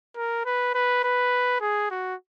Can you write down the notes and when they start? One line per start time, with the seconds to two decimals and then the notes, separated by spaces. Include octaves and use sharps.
0.16 A#4
0.45 B4
0.74 B4
1.04 B4
1.61 G#4
1.91 F#4